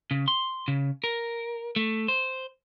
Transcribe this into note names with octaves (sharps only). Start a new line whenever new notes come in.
C#3
C6
C#3
A#4
A3
C5